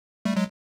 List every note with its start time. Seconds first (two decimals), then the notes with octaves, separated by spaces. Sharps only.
0.25 G3 A3
0.36 F#3 G#3